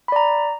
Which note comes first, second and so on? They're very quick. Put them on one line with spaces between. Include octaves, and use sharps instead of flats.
B5 D5 A#5